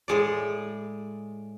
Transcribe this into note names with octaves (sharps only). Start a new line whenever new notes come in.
A2 G#3 D5